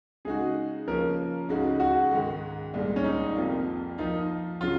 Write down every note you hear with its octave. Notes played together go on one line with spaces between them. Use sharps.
C#3 G#3 D#4 F#4 G#4
C#3 F3 A#3 C#4 A#4
C#2 C#3 G#3 D#4 F#4
F#4
G#2 D#3 G#3
C2 A#2 G#3
C#4
D#4
F2 C3 F3 A#3 F4
F3 A#3 D#4 F4
C#3 F#3 F4